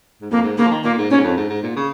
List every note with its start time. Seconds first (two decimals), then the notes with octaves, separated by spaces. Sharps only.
0.22 G#2
0.31 F2 A#3
0.44 G#2
0.58 C#3 A#3
0.65 F3
0.71 D#3
0.84 A#2 A#3
0.98 G#2
1.10 A#2 C#4
1.17 G#2
1.23 F2
1.37 G#2
1.50 G#2
1.63 A#2
1.76 C#3